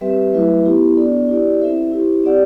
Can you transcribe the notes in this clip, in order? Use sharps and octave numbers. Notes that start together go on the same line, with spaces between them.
G3 C4 G4 B4 E5
F#3 A3 E4 B4 E5
B3 E4 G4
B3 D4 A4 D5
E4 G4 D5
C4 E4 A4 C5 E5
E4 G4 C5
C4 G4 D5 F#5